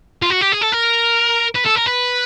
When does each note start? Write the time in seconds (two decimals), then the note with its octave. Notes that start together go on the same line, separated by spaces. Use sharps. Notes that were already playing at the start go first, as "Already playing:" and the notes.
0.23 F4
0.30 F#4
0.41 G4
0.52 G#4
0.61 A4
0.72 A#4
1.56 B4
1.66 A4
1.76 A#4
1.86 B4